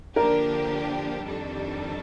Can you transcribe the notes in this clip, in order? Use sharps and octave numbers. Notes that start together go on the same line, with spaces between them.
D3 F3 A#3 D4 G4 A#4
F2 D#3 G3 D4 A4